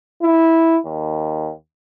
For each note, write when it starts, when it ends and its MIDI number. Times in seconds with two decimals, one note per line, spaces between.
0.22 0.79 64
0.86 1.51 39